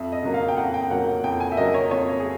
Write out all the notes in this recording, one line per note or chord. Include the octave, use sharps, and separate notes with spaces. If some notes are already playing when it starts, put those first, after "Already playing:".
Already playing: F2 E5
D#5
C#3 F#3 A#3
F5
G5
F2 F#5
G5
C#3 F#3 A#3 F#5
F#5
F2 G5
G#5
E5
C#3 F#3 A#3 D#5
C#5
F2 C#5
G#4